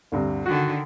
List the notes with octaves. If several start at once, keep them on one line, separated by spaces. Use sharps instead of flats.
D2 G2 C3
D3 D#3 F#4